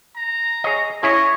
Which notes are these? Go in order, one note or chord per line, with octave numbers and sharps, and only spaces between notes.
A#5
G#4 C#5 D#5
C#4 E4 G#4 C#5 D#5